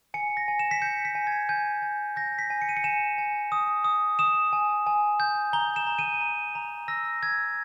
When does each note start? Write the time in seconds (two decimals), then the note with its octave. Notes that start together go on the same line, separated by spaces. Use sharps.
0.14 G#5 C#7
0.37 A#6
0.48 G#5
0.59 E7
0.71 B6
0.82 G6 C#7
1.05 B6
1.15 G#5
1.27 G#6
1.49 G#5 G6
1.82 G#5
2.16 G6 A#6
2.39 B6
2.50 G#5
2.62 C#7
2.69 D#7
2.77 C#7
2.84 G#5 E7
3.18 G#5
3.52 D#6
3.84 D#6
4.19 D#6 E7
4.53 G#5
4.87 G#5
5.20 G6
5.53 A#5 G7
5.76 E7
5.87 A#5
5.99 D#7
6.21 A#5
6.55 A#5
6.88 E6 A#6
7.22 E6 G#6